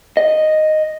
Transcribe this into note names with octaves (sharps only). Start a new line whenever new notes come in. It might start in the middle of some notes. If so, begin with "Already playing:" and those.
D#5